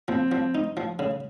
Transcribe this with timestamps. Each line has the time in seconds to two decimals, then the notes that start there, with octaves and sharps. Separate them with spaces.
0.08 F3 C4
0.32 F3
0.55 D#4
0.77 F3
0.99 C#3